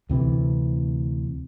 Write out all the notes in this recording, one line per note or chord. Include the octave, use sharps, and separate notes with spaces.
D2 C3 E3